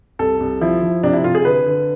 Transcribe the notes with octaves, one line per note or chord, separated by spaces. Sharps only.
C2 A4
C2
F3 E4
F3
C3 D4
E4
C3 F4
G#4
D3 B4
D3